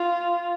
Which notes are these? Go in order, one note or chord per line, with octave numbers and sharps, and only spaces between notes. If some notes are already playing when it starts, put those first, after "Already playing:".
Already playing: F4